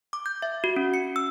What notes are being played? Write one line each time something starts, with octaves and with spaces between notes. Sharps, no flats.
D6
G6
E5
F#4
C#4
C#7
E6